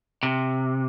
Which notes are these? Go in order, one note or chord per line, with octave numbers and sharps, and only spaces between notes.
C3